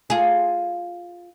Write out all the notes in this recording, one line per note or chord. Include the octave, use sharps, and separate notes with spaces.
F4 G#4